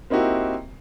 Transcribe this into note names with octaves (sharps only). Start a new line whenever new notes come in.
A#3 C4 D#4 E4 F#4 G4